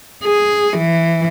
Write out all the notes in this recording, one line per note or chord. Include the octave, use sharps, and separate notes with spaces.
G#4
E3